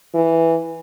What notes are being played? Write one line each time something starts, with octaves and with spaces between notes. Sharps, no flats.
E3